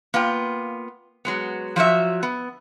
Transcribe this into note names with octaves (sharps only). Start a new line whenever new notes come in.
A#3 B3 F4 G5
F#3 G#3 B3
F3 F#3 F#4 E5
B3